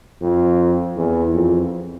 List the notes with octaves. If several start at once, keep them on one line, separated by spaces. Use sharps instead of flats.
F2
E2
F2